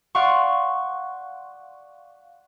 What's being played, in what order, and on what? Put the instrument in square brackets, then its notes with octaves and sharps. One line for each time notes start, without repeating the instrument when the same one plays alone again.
[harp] D5 F5 F#5 C6 C#6